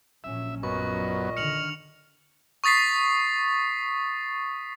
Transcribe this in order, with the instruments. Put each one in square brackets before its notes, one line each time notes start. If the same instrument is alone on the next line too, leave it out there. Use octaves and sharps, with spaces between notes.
[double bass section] A#1 F#3 C#4 [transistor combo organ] E5
[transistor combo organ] F#2 B3 [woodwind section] A#2 A#4 D#5 [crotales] C#6
[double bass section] D3 D#3 [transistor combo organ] F6 [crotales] C#7 F7 F#7
[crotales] C#6 D#6 A6 B6 C7